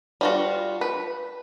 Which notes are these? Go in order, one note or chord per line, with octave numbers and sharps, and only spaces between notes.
G3 F4 F#4
B4